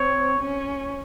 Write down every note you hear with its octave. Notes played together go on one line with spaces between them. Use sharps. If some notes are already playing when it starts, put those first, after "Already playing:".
Already playing: C4 C#5
C#4